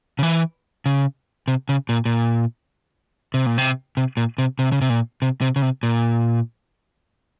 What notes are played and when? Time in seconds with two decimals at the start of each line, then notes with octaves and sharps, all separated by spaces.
0.19 C#3
0.23 E3
0.86 C#3
1.48 C3
1.69 C#3
1.89 A#2
2.05 A#2
3.34 C3
3.46 A#2
3.58 C3
3.97 C3
4.17 A#2
4.38 C3
4.59 C3
4.72 C#3
4.82 C3
4.90 A#2
5.22 C3
5.41 C3
5.56 C#3
5.62 C3
5.83 A#2